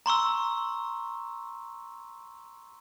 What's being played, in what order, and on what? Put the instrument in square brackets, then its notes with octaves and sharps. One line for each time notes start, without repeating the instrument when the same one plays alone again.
[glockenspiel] A#5 C6 C#6 E6